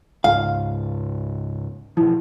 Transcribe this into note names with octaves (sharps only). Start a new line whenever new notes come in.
C#2 G#2 F5
B2 F3 E4